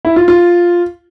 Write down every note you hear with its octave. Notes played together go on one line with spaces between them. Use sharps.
E4
F4
F4